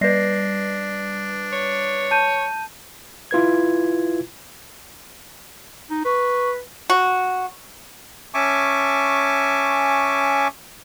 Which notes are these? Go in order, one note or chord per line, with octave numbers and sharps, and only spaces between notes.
G3 D4 B4 D5 A#6 C7
C#5
A5 G6 D#7
E4 F4 B4 G#6
D#4
B4 C#6
F#4
C#4 E5 G#5 A5 C#6 D6